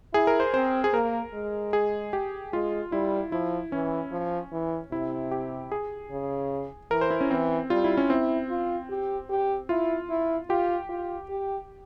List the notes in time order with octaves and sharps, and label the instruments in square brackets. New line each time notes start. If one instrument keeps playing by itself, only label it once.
[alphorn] E4 [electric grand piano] G#4
[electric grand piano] A#4
C5
[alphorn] C4 [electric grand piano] C5
[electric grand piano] G#4
[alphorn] A#3 [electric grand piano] A#4
[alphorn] G#3
[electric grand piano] G#4
G4
[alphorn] G#3 [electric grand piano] F4
[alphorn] G3 [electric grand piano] E4
[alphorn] F3 [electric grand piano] E4
[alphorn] E3 [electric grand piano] C#4
[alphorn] F3
E3
[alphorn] C3 [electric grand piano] E4
[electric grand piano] G4
G#4
[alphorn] C#3
[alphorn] E3 [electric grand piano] A#4
[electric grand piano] C5
E4
C#4
[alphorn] E3 [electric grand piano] C4
[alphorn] G3 [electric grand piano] F4
[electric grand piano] E4
C#4
[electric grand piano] C4 [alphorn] E4
[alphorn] F4
G4
G4
[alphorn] E4 [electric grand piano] F4
[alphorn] E4
[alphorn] F4 [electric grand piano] G4
[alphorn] F4
G4